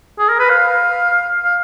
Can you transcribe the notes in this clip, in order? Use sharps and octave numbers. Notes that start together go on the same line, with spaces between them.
G#4
A#4
B4
F5
F5